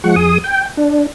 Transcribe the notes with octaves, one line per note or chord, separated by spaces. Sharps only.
F3 G#3 F#5 C#6
F2 G#4 D#6
G5
D4